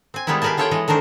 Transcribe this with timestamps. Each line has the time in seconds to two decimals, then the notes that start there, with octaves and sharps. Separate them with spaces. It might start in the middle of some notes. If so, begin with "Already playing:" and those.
0.14 C4 G#5
0.27 D#3 G3 G#3 B3 D#4 E4
0.42 G4 G#4 A#4 B4 G#5 A5
0.57 B3 F4 A4 C#5 F#5 G5
0.71 E3 G#3 D#5
0.88 D#3 A3 D4 A#4 C5